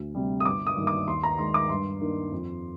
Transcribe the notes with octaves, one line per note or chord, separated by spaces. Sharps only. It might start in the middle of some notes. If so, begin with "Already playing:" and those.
Already playing: D2
C3 G3
D#6
G1 D6
D#6
G2 D#3 A#3
D6
D#2 C6
A#5
D#3 G#3 C6
D6
G2 C6
D#3 A#3 D4
F2